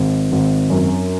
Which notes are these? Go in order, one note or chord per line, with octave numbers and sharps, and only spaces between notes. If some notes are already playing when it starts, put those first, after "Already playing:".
Already playing: G#1
G#1
F#2